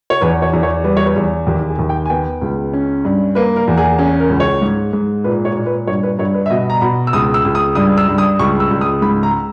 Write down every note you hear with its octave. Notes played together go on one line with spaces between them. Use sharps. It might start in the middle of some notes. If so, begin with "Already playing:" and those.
C#5
E2 B4
C#5
E2
C#5
G3 B4
C#5
B4
E2
D#2 G4
G#4
D#2
G5
G#5
B3 G5
C#2
C#4
G2
A#3 B4
A#4
E2
G#4
C#4 G#4
A#4
C#2
C#5
G#2
G#2
A#2 B4
C#5
A#2
B4
G2 C#5
B4
G2 C#5
B4
E5
B2 D#5
A#5
B2 B5
E6
C#2 D#6
E6
C#2
D#6
G2 D#6
E6
G2
D#6
C#2 C#6
E6
C#2
D#6
G#2 B5
A#5